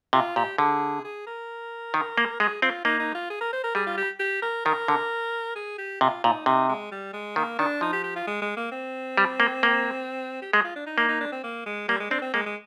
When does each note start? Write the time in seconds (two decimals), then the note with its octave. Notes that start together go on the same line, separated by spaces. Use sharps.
0.13 C3 F4
0.36 A#2 G4
0.58 D3 G#4
1.04 G#4
1.27 A#4
1.94 D#3
2.18 A#3
2.40 G#3 G#4
2.62 C4 F4
2.85 A#3 D#4
3.00 D#4
3.15 F4
3.30 G#4
3.41 A#4
3.53 C5
3.64 A#4
3.75 G3 G#4
3.87 F4
3.98 G4
4.20 G4
4.42 A#4
4.65 D#3 A#4
4.88 D3
5.56 G#4
5.78 G4
6.01 C3 F4
6.24 A#2 D#4
6.46 C3 D#4
6.69 G#3
6.92 G3
7.13 G#3
7.36 D#3 A#3
7.59 D#3 D4
7.81 F3 D#4
7.93 G4
8.04 G4
8.16 F4
8.28 G#3
8.42 G#3
8.57 A#3
8.72 C4
9.17 G3
9.40 A#3
9.63 A#3
10.42 G4
10.53 G#3 G#4
10.64 F4
10.76 D4
10.87 D#4
10.98 A#3 D#4
11.09 D#4
11.21 D4
11.32 C4
11.44 A#3
11.66 G#3
11.89 G3 A#3
12.00 G#3
12.10 C4 D4
12.22 C4
12.34 G#3 A#3
12.46 G#3